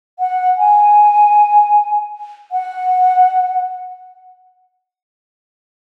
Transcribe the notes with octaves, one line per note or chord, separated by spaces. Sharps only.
F#5
G#5
F#5